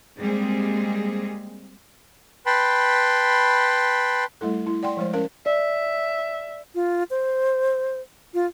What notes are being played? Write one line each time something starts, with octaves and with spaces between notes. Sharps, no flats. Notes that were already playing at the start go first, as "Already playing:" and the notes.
G3 G#3 A#3 C4 G#4
B4 G5 A5 B5 C6
G3 A3 E4 A4
E4
D5 F#5 G5 C6
F3 G#3 C5
C#4 A#4 F5
D5 E5
F4
C5
F4